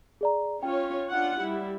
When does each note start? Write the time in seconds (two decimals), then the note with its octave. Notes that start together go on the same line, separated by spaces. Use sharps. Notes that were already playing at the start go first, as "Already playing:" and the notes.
0.21 G#4 D5 A#5
0.63 C#4 F4 C#5 G5
1.11 D4 F4 F#5
1.40 G3 E4